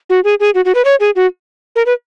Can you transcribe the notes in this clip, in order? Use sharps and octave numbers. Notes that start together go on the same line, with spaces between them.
F#4
G#4
G#4
F#4
F#4
B4
C#5
G#4
F#4
A#4
B4